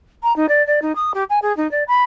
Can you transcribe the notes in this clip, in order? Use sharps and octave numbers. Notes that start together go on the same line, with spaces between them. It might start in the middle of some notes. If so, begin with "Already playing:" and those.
A#5
D#4
D5
D5
D#4
D#6
G4
G#5
G#4
D#4
D5
B5